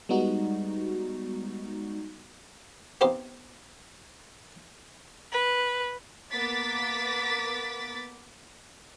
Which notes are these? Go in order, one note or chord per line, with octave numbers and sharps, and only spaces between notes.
G3 G#3 B3 D#4 F#4
B3 C4 D#4 F4 G4
B4
A#3 B3 D6 A6 B6